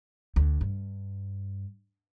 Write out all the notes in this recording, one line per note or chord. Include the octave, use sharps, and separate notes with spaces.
D2
G2